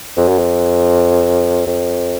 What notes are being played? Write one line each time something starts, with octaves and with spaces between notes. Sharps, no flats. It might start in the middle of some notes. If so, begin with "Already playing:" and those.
F2
F#2
F2
F2